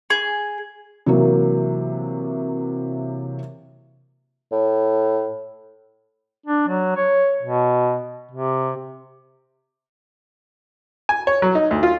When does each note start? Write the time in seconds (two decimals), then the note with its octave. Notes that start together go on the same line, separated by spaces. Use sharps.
0.10 G#4
1.06 C3 E3 F#3 A#3
4.52 A2
6.46 D4
6.68 F#3
6.96 C#5
7.42 B2
8.32 C3
11.09 G#5
11.27 C#5
11.42 F#3
11.55 D#4
11.71 D2
11.83 F4